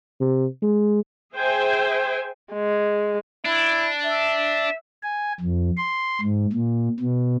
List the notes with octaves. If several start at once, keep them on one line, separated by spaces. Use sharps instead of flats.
C3
G#3
G#4 C5 E5 G5 G#5
G#3
D4 E4
E5
G#5
F2
C6
G#2
A#2
B2